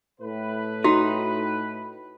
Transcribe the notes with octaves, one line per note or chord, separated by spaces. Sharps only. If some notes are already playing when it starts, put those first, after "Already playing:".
A2 B4
D#4 F#4